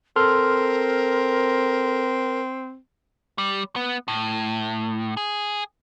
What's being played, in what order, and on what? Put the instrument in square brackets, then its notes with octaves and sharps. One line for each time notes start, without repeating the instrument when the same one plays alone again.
[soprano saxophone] C4 [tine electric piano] A4 C6 F6 [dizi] A#4
[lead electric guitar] G3
B3
A2
G#4